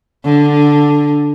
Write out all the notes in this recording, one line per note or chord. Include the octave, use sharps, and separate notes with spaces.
D3